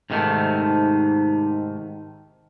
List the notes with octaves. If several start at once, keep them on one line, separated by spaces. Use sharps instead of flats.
G#2 C3 D#3 G#3 A3